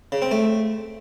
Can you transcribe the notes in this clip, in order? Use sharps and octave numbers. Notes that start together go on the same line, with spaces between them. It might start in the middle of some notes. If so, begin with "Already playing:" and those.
C#3
C4
A3